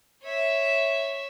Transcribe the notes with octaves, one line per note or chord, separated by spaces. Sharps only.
C#5 E5